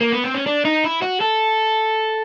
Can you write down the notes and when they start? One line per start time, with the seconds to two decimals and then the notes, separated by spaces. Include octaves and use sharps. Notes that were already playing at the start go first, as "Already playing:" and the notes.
0.01 A#3
0.12 B3
0.24 C4
0.35 C#4
0.47 D4
0.65 D#4
0.84 E4
1.02 F#4
1.20 A4